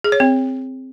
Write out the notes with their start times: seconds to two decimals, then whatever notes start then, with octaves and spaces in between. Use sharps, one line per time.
0.04 G#4
0.12 C#5
0.20 C4